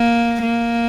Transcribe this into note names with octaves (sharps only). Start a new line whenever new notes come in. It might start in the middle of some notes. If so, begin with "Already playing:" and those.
Already playing: A#3
A#3